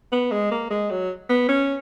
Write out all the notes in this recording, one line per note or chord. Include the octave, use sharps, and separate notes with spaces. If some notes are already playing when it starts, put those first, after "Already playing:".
B3
G#3
A#3
G#3
F#3
B3
C#4